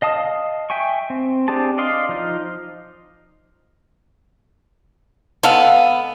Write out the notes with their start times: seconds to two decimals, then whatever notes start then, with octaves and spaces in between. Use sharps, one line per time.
0.02 D#5 F5 A5 D#6
0.70 E5 G5 G#5 C#6
1.10 C4
1.48 C4 D4 G4 G#4 A5
1.78 D5 D#5 F5 C6
2.09 F3 D#4 F6
5.43 G#3 B3 A4 F5